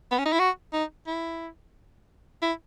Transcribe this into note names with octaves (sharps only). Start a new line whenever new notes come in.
B3
C#4
D#4
E4
F#4
D#4
E4
E4